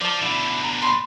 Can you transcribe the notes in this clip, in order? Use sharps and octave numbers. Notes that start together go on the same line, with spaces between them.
F3 D5 A5
B2 D3 E4 D5
A#5
B5 C6